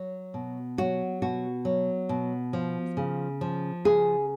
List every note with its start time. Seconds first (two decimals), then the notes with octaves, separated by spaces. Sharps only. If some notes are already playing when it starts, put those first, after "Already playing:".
Already playing: F#3
0.34 B2
0.78 F#3 F#4
1.22 B2 F#4
1.65 F#3
2.09 B2
2.53 F3
2.97 C#3
3.41 F3
3.85 C#3 G#4